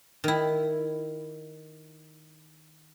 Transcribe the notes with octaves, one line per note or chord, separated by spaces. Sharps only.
D#3 E4